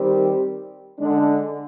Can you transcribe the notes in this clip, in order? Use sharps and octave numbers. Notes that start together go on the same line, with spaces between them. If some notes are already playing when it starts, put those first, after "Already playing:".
Already playing: D#3 G3 C4 G4
D3 G#3 D4